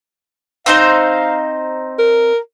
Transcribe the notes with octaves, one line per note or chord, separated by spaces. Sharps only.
C4 D#4 C5 F5
A#4